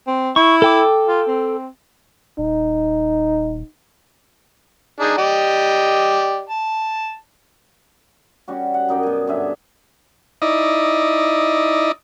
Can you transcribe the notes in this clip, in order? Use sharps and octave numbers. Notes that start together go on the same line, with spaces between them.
C4
E4 C#6
A4 G5 D6
F4
C4
D#1 D#4
D4 D#4 G#4
G4 D5 D#5
A5
G3 C#4 F#4
F#5
F#2 D#4 D5 G5
B2 G#5
G2 D3 E5 G#5
D#4 E4 D5 D#5